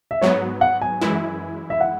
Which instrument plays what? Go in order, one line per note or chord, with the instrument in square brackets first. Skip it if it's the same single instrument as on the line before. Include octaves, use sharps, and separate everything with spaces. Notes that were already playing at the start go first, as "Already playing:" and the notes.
[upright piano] E5
[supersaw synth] G#2 F#3 B3 [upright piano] C#5
[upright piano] F#5
G#5
[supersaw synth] F#2 E3 G#3 E4
[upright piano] E5
F#5